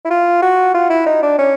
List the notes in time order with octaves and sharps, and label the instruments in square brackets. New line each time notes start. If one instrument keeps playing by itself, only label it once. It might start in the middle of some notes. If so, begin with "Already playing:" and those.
[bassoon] E4
F4
F#4
F4
E4
D#4
D4
C#4